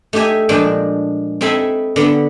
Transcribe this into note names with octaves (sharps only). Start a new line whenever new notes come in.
A3 D#4 G4 E5 G#5
A#2 F3 G#3 D4 G5
C4 D#4 A4 E5 G#5 B5
D3 B3